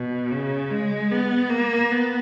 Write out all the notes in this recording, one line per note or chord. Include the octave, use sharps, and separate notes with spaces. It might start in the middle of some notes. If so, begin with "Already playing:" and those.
Already playing: B2
C#3
G#3
B3
A#3
B3